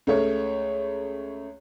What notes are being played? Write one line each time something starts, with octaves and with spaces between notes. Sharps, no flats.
C#2 A3 C#5